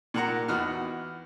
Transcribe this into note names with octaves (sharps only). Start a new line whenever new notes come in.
A#2 F#5 A#5
E2 D#4 F#4 F6